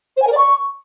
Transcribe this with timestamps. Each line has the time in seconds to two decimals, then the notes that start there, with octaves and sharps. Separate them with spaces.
0.16 C5
0.21 G#5
0.27 A#4
0.32 D5
0.37 C#6